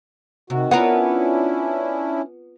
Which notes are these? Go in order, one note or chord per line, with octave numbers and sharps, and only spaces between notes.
C3 D#3 F#4
B3 C#4 D4 E4 F4 A#4 F#5